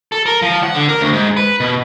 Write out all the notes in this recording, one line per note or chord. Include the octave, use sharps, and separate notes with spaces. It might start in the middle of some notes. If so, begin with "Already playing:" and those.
A4
A#4
F3
F#5
D3
A#4
D2
G#2
B4
B2